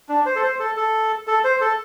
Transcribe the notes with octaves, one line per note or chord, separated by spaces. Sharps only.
D4
C5
A4
C5
A4
A4
A4
C5
A4